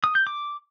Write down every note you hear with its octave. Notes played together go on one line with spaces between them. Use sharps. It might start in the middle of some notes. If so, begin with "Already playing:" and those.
D#6
G6
D6